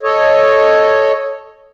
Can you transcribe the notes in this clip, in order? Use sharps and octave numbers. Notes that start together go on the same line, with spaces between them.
A4 C#5 D#5